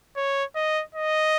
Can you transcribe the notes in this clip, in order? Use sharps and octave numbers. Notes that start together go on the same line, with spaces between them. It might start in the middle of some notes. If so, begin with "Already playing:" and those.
C#5
D#5
D#5